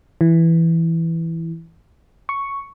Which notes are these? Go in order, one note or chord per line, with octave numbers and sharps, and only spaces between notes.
E3
C#6